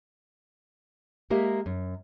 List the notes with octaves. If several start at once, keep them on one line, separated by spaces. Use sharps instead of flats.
G#3 A#3 G4 A#4 E5
F#2